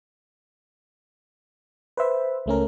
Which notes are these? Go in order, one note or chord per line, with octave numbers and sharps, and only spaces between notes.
B4 C5 E5
C#2 A3 C#4 A#4